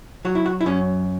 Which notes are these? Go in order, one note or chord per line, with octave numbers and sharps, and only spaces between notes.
F#3 F#4
E4
F#4
E4
F#2 C#4